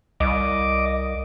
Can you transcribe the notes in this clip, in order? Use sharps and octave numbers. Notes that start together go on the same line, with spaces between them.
C2 D#5 D6